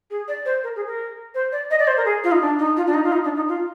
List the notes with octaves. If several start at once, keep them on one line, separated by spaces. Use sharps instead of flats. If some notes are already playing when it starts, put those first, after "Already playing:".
G#4
D5
C5
A#4
G#4
A#4
C5
D5
D#5
D5
C5
A#4
G#4
F4
D#4
D4
D#4
F4
D4
D#4
F4
D#4
D4
D#4
F4